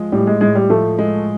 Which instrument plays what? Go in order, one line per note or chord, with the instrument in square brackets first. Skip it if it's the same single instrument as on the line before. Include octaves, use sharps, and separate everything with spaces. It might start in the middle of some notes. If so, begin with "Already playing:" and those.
Already playing: [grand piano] F3 G#3
[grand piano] A2 [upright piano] G3
[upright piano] G#3
[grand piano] A2 [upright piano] G#3
[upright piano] G3
[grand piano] F3 [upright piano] A3
[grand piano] G#3